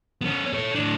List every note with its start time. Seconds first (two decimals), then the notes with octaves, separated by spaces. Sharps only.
0.21 B3 C#4
0.53 A4 C#5
0.75 A2 D4